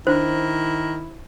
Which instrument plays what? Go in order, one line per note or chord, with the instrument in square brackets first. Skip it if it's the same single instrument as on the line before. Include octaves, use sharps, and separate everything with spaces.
[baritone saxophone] D#3 [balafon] D4 [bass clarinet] E4 [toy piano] C5